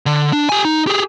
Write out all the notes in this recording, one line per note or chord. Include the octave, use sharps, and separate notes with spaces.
D3
D4
G4 G#5
D#4
G4 G#4